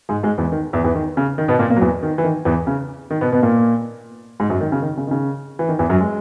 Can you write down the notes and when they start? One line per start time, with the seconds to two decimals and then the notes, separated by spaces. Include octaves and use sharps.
0.09 G#2 G#3
0.23 G#2 G#3
0.38 E2 E3
0.52 D#3
0.73 E2 E3
0.84 E2 E3
0.95 D#3
1.17 C#3
1.38 D#3
1.48 B2 B3
1.59 A#2 A#3
1.70 A#2 A#3
1.77 F#3
1.81 E2 E3
2.03 D#3
2.18 E3
2.24 D#3
2.45 E2 E3
2.67 C#3
3.10 D#3
3.21 B2 B3
3.32 B2 B3
3.42 A#2 A#3
4.40 G#2 G#3
4.50 F#2 F#3
4.61 D#3
4.72 C#3
4.82 D#3
4.97 C#3
5.07 D#3
5.11 C#3
5.59 E3
5.69 D#3
5.79 E2 E3
5.90 F#2 F#3
6.01 G#3